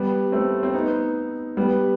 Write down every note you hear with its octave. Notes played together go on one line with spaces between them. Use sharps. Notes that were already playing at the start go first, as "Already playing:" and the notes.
Already playing: G3 B3
A3 C4
C4
B3 D#4
G3 B3